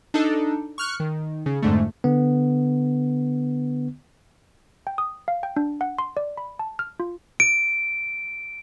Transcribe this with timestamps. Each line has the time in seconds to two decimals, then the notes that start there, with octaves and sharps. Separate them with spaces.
0.14 D4 D#4 A4
0.78 C#6 F6 F#6
1.00 D#3
1.46 C#3
1.62 F2 G#2 D3 A3
2.04 D3 B3
4.87 G5
4.98 D#6
5.28 F5
5.43 G5
5.56 D4
5.81 F#5
5.99 C6
6.17 D5
6.37 B5
6.59 A5
6.79 F6
7.00 F4
7.40 D7